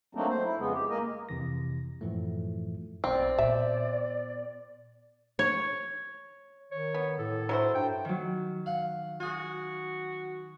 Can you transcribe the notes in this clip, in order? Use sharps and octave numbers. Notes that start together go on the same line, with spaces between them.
F#3 A3 A#3 C4 D4 D#4
C5
E4
F2 C#3 G#3 B3
G4
G#3 A#3 A#4 D#5
F2 C3 E3 A#6
F#2 A2 E3 F3 A3
B1 C4 D5
A#2 B3 E5
C#5
D#3 C#5
B3
A2 A4
F#3 E4 C5
G2 G5
D#3 F#3
F5 F#5
F#4 G#4 G#5